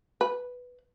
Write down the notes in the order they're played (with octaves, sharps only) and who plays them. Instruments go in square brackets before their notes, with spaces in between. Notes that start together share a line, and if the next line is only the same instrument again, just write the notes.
[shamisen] B4